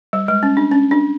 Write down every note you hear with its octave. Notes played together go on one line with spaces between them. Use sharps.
G3
G#3
C#4
D4
C#4
D4